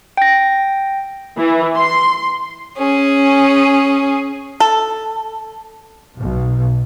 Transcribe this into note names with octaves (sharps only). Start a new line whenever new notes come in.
G5 A#6
E3
C6
C#4 G#4
A4
B1 B2